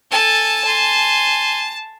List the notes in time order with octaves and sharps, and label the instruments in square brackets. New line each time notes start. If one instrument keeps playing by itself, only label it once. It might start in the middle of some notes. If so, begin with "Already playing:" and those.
[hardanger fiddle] A4 G#5 [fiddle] A5
[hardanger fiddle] G#5 C6